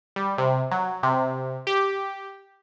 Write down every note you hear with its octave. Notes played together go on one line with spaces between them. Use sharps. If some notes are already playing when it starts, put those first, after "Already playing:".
G3
C3
F#3
C3
G4